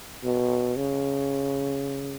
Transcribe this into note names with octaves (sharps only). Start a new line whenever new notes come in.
B2
C#3